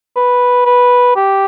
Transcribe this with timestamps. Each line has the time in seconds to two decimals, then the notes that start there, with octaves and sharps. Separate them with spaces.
0.16 B4
0.66 B4
1.16 G4